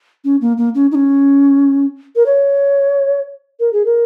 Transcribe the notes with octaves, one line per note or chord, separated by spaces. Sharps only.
C#4
A#3
A#3
C#4
D#4
C#4
A#4
C#5
A#4
G#4
A#4